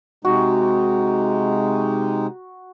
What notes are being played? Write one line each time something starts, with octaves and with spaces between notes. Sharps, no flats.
C3 G#3 D#4 F#4